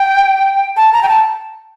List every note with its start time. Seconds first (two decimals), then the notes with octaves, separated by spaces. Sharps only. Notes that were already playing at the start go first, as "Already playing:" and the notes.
Already playing: G5
0.77 A5
0.93 A#5
1.03 G5
1.08 A5